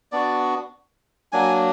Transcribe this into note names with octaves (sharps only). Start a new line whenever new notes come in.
B3 D4 F#4 D5
F#3 A#3 D4 G#5